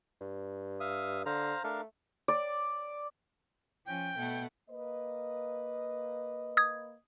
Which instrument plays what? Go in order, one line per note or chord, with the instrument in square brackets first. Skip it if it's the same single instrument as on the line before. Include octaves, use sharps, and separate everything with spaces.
[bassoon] G2
[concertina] E5 F5 D#6
[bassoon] D3 [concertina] C5 F5 A#5
[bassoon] A3 [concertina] D4 A#4 F5
[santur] D5
[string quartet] F3 C#4 [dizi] G5
[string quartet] B2 A3 F#5
[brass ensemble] A#3 B4 D#5
[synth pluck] D#6 G#6